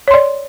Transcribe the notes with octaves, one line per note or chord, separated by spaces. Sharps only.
C#5 D5 C6